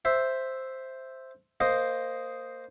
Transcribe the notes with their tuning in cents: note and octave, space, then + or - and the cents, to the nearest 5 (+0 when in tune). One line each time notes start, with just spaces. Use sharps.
C5 +0 E5 +0
A#3 -10 C5 +0 D#5 +0